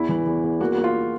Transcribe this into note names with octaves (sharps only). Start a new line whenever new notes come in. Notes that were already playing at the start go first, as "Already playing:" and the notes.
Already playing: E2 E4
E3
E2
E2
A#3 F#4
F#4
A#3
F4